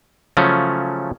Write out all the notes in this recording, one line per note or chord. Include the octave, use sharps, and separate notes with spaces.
C#3 F3 F#3 A3 C#4